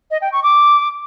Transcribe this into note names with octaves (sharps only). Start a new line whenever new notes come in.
D#5
G5
C#6
D6